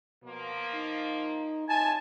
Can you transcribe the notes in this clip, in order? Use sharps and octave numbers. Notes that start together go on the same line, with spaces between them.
B2 F3 A#3
D#4
A2 C3 F3 D#4 G#5 A5